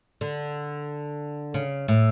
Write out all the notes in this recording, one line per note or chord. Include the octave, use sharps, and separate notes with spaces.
D3
C#3
A2